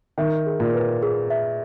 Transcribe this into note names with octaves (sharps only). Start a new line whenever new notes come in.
D#3 E5
G#4
A#2
B4
G#4
E5